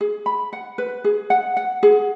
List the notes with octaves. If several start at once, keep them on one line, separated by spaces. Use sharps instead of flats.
G#4
B5
F#5
B4
G#4
F#5
F#5
G#4